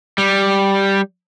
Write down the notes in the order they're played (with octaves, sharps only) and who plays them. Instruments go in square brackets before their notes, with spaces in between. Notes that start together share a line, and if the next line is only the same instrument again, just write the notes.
[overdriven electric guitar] G3